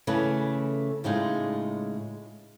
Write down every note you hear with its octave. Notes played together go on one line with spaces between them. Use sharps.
C#3 E3 A3 C#4 A4 B4
A2 C#3 G#3 D#4 F4 G#4